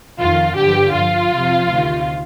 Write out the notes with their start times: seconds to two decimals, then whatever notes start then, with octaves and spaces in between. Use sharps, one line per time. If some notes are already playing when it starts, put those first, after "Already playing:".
0.19 F2 D#3 F4
0.56 G2 D3 F3 G4
0.93 G2 F3 F4
1.31 F2 C3 F3
1.68 D2 C3 D#3